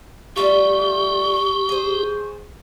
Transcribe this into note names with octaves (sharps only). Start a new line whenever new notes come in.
G3 A3 F4 G4 C#6
G#4 C5